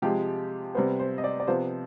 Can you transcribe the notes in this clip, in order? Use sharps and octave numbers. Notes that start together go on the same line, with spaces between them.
C3 F3 G#3 G4
C3 G3 B3 C5
C5
D#5
D5
D5
C3 F3 B3 C5